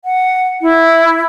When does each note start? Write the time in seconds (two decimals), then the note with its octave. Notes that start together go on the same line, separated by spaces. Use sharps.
0.05 F#5
0.62 E4